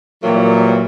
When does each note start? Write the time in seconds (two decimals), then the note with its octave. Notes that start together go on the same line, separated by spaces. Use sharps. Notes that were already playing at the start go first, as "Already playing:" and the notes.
0.24 A#2 E3 F#3 G3 A#3